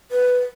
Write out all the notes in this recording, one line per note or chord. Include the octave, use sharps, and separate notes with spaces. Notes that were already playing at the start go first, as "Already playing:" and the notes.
B4